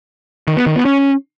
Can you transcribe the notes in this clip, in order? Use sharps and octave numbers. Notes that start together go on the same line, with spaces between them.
D#3
B3
D#3
B3
C#4